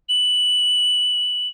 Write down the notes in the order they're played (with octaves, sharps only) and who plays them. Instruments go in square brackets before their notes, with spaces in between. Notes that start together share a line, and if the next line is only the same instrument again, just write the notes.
[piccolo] F#7